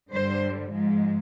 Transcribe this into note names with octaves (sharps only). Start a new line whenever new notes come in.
G2 D3 G3 C5
G#2 F3 G#3